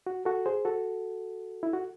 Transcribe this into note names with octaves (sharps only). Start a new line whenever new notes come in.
F#4
F#4 A4
G#4 C5
F#4 A4
E4
F#4